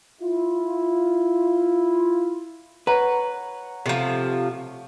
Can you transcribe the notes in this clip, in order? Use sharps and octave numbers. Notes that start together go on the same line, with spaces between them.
E4 F4
B4 C#5 F#5 A#5
C3 F3 A3